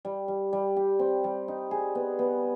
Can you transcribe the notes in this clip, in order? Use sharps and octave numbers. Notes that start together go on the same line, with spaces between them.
G3
G3
G3
G4
C4
G3
D#4
G#4
B3
B3